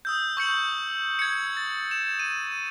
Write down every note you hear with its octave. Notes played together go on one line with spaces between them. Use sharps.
D#6 E6 G6
C#6 G6 C#7 F#7
G#6 C#7
A6
E7
D#7